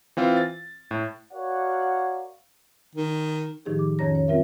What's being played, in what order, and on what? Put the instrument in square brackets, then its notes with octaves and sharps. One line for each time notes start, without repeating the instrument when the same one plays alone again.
[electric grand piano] E3 C4 F4
A6
A2
[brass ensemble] F#4 A#4 C#5 D5 F5 F#5
[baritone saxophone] D#3
[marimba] A2 D#3 F3 D#4 G4 G#4
D6
F2 D#3 C#4 C#5 A#5 A#6
C#5
G3 C4 F4 A#4 E5